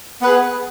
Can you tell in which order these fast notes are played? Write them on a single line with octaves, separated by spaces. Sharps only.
B3 B4 G#4